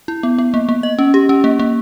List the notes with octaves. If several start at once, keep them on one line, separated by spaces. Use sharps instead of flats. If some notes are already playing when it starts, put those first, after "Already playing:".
E4
B3
B3
A#3
A#3
D#5
C#4
G4
C#4
A#3
A#3